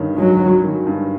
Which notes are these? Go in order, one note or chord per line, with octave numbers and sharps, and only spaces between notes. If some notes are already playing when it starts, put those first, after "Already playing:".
Already playing: G2 D#3 C#4
F#3 G#3
C#4
D#3
G2